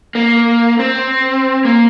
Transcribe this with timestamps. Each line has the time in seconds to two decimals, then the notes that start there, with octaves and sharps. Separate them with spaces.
0.15 A#3
0.79 C4
1.65 A#3